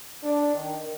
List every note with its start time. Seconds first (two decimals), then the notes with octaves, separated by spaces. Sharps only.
0.24 D4
0.55 D#3